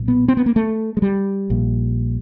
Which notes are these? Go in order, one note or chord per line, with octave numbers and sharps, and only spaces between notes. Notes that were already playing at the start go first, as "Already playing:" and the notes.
Already playing: B1 A#2
B3
C4
B3
A#3
A3
G#3
G3
A#1 A#2